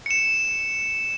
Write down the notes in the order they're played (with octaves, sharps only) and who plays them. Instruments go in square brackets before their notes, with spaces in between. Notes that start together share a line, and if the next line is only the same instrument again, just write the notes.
[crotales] C#7 E7